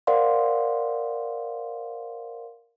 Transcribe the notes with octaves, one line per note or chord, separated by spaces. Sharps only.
A#4 C5 D5 F5 F#5 C6